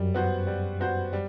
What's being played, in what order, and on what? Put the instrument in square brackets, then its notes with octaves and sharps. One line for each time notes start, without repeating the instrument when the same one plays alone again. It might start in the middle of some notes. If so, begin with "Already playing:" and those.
Already playing: [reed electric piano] F#2 [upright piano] G3
[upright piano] B3 F#4 C5
G3
B3 F#4 C5
G3